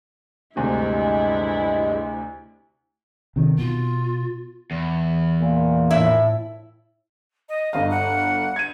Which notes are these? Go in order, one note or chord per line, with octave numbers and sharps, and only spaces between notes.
D2 G2 C3 G#3 E4
C3 D#3
B2 F4
E2
A#2
A2 E4 E5
D#5
G1 D#5 F5
F#5
G#6 D#7